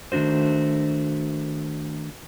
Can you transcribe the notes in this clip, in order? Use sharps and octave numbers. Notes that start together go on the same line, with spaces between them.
D#3 A3 D4 F#4 C5